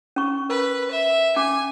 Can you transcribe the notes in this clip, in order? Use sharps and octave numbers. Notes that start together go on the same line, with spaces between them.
C#4 C#6
A#4 B4
E5
C#4 G5 G#5 D6